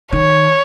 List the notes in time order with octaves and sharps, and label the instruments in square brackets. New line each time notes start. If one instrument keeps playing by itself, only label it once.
[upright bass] D#3 [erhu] C#5